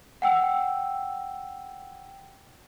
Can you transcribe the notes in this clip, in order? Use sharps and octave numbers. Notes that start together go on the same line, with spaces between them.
F#5 G5 E6